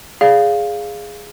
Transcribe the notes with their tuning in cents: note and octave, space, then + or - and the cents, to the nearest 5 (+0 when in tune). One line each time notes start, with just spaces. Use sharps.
G#4 +0 D5 +0 F5 +0